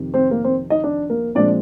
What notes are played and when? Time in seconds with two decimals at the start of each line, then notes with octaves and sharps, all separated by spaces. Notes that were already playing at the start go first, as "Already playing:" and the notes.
Already playing: F2 C3 D#3
0.14 C4 C5
0.31 A#3 A#4
0.44 C4 C5
0.70 D#4 D#5
0.84 D4 D5
1.10 A#3 A#4
1.35 A#2 F3 G#3 C4 D4 D5